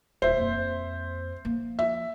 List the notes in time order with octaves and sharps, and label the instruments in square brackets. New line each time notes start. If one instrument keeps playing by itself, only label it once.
[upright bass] D#1 [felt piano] C5 E5
[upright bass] F2 A#3
F3 A#3
[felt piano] E5